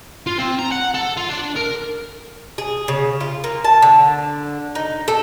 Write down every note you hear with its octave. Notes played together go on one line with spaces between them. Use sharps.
F4
C4
A#5
F#5
A4
F4
D4
A#4
G#4
C#3
F4
A#3
A5
D3
D#4
A4